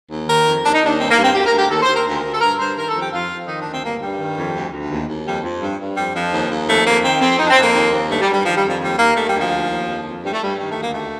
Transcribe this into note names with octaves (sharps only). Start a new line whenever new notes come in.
D#2
D#3 A#4
F2
D#2 D4
D#4
D#2 D4
G2 C4
A#3
G2
C4
D2 G4
A#4
D2
G4
D#2 A4
C5
D#2
A#4
D2 A#4
D2
A4
G2 A#4
G2 C5
D#3 A#4
A4
F2
G4
F2 F4
F2
D#3 D#4
D4
D2
C4
G2 A#3
G2 G3
D#3
F2
D2
D2
D#2
D#2
F2 G3
F2
G2
G2
F2 G3
F2 F3
D#2
D#2
F2 A3
F2 A#3
D#3 C4
F2 C4
F2 D#4
D4
C4
F2
A#3
D#2
D#2
G2 A3
G3
G2
G3
D#3 F3
G3
F2
F3
D#2 G3
D#2 A#3
D#3 A3
G3
D2
F3
D#2
D#2
F2
F2
G2 G3
A3
G2 G3
D#3 G3
A3
D2
A#3
D#2 A3